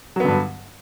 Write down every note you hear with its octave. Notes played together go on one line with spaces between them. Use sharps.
G2 D3 F#3 B3